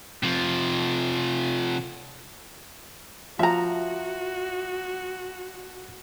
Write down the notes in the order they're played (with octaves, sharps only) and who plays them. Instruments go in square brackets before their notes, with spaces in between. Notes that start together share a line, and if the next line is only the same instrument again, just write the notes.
[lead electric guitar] C3 F3
[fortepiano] F3 [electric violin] F#4 [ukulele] E5 A#5